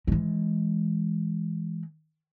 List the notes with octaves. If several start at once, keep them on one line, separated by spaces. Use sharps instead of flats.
E3 G#3